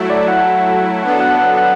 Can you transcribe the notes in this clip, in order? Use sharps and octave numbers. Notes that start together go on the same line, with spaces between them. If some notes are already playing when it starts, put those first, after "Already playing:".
Already playing: F#3 A3 E4
D5
F#5
F#3 B3 D4 A4 F#5
F#5
F#5
F#5